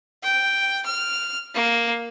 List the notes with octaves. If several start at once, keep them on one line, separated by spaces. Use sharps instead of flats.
G5
F6
A#3